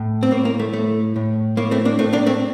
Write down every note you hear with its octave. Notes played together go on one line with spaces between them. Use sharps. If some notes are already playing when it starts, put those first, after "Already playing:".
Already playing: A2
C4
A2 A#3
A#3
A3
A2 A3
A2
A2 A#3
A3 C4
A#3 D4
A2 A3 C4
A#3 D4
A3 C4